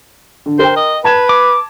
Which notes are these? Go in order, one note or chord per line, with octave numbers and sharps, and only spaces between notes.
D3
A#4 C5 G5
D#5
B4 A5 G#6 E7
D6